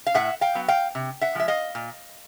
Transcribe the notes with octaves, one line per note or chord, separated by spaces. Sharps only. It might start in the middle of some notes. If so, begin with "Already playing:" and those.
F5
A2 E5 F#5
F5 G5
F#3 B3
F5 G5
C3
E5 F#5
F3 G#3 E5
D#5 F5
A#2